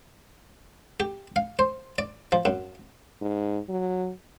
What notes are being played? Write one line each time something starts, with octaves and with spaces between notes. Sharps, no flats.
G4
F5
C5
D5
F3
F#2
G#2
F#3